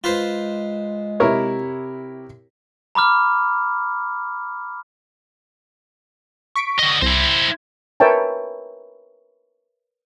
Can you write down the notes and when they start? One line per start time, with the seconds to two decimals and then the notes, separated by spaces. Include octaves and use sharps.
0.04 G#3 F4 B4 C5
1.20 C3 E4 G4 A#4 C#5
2.95 A#5 B5 D6 F6
6.56 C#6 B6 D7
6.79 D3 D#5
7.02 C2 E4 C5 A#6
7.38 G#6
8.00 A#4 B4 C#5 E5 G5 A5